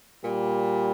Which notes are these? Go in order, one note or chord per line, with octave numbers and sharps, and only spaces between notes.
A#2 G3